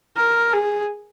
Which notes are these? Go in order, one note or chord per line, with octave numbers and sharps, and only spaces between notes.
A#4
G#4